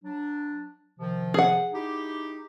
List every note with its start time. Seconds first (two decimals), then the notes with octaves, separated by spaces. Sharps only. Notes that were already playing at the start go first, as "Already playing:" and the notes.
0.04 F#3 D4
1.00 C3 D#3 F3
1.34 G#4 F#5
1.74 D#4 E4 G4